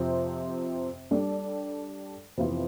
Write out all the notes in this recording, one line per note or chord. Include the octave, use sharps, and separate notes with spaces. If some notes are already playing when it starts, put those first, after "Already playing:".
Already playing: F2 C3 F3 C4
G3 D4 A4 D5
F2 C3 E3 B3 F4